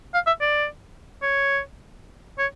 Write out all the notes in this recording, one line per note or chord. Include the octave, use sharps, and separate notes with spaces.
F5
E5
D5
C#5
C#5